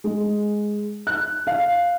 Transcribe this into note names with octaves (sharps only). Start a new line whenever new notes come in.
G#3
F#6
F5